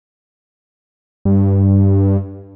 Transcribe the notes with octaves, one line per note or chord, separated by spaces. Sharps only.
G2